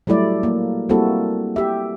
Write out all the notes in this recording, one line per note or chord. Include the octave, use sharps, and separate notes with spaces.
F#3 G3 A3 E4 D5
A#3
G3 A#3 C4 E4 F#4 A4
G4 E5